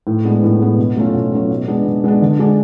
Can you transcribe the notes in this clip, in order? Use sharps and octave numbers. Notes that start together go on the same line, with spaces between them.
A2
G#3 B3 D4
A2
G#3 B3 D4
B2
F#3 A3 C#4 F4
B2
F#3 A3 C#4 F4
B2
G#3 B3 D4
B2
G#3 B3 D4
D3
G#3 D4 G#4 D5